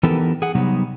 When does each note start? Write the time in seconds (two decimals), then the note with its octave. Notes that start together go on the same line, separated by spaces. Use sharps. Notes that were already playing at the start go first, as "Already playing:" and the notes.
0.03 E3 B3 D#4 G4 A4 A#4
0.42 G#4 F#5
0.55 C3 F#3 G3 B3 D#4